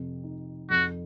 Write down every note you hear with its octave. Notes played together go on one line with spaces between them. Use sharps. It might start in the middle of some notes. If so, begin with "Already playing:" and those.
Already playing: F2 C3
D#4
F2 F#4